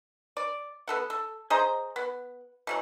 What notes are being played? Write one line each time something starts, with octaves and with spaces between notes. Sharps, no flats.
D5
B3 A4 F#5
A4
G#4 C5 D#5 A#5
B3
B2 E3 F#3